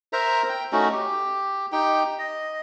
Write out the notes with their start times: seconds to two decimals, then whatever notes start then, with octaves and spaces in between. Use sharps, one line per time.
0.13 A#4 C5 E5 A#5
0.49 G5
0.72 A3 C#4 D#4 F#4
0.92 G4
1.72 D#4 G4 G5
2.19 D#5